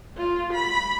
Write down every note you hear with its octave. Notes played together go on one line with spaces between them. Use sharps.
F4
B5